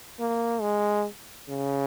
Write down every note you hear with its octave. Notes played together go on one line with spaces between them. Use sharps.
A#3
G#3
C#3